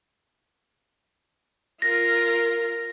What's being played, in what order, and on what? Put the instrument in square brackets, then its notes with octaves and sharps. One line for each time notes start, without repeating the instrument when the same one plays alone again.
[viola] F4 A#4 [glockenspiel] A#6